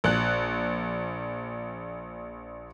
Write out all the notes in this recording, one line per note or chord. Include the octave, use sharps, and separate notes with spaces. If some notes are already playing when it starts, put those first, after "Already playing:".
A#1 F#6